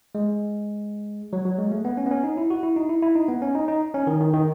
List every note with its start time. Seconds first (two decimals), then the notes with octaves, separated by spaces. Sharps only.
0.15 G#3
1.33 F#3
1.45 F#3
1.58 G#3
1.72 A3
1.85 B3
1.97 C#4
2.06 B3
2.11 C#4
2.24 D#4
2.37 E4
2.50 F#4
2.63 E4
2.76 D#4
2.89 E4
3.02 E4
3.15 D#4
3.29 B3
3.42 C#4
3.55 D#4
3.68 D#4
3.94 C#4
4.07 D#3
4.21 D#3
4.33 D#3